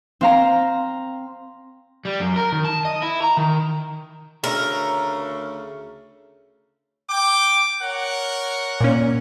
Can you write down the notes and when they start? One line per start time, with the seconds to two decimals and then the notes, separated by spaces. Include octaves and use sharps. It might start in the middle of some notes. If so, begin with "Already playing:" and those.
0.21 C4 F5 A#5
2.05 G3
2.20 F#2
2.36 A#4
2.52 D#3
2.65 A5
2.85 D#5
3.02 E4
3.22 A#5
3.37 D#3
4.44 D2 C#3 A3 A#4
7.09 G5 D6
7.82 A#4 C#5 F#5
8.80 A#2 C#4